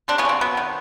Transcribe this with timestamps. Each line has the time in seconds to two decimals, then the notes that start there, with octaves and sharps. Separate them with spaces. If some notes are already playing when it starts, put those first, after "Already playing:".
0.08 G3 C4 D4
0.18 B3 C#4
0.25 C#3 C4
0.41 F#3 B3
0.57 D#3